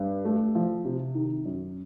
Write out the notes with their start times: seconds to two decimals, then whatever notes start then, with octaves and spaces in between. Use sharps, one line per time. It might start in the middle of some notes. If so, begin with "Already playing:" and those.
Already playing: G2
0.25 A3
0.55 F3
0.85 C3
1.15 D#3
1.45 F#2